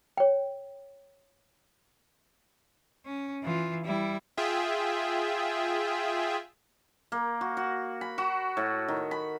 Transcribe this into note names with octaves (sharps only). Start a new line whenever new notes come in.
C#5 G5
C#4
E3 F4
G3 E4
F4 G#4 E5 G5
A#3
F#4
F#4
B5
F#4
A2
D#3
B5